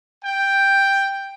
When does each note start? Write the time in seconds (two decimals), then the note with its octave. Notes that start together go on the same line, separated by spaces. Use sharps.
0.25 G5